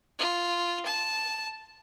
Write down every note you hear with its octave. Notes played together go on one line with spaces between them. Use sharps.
F4
A5